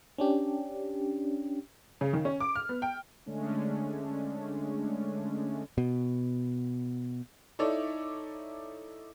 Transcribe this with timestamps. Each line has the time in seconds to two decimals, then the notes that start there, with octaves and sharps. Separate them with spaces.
0.18 C#4 D4 G4
2.01 C#3
2.13 D#3
2.25 C#4
2.40 D6
2.55 F6
2.69 B3
2.82 G5
3.26 D3 G#3 A3 C#4 D4
5.78 B2
7.59 D#4 E4 A4 C#5 D5 E5